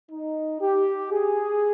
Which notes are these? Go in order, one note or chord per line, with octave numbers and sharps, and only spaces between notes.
D#4
G4
G#4